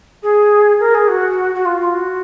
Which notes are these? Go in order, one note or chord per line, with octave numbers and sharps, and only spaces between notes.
G#4
A#4
G#4
F#4
F#4
F4
F4
F#4